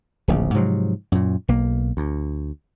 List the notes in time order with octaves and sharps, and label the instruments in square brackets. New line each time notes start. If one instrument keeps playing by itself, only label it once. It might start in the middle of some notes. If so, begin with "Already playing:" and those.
[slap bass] D1 A#1 C#3
G#2 C3 F3 F#3
F#2 A#2
B1 A#3
D2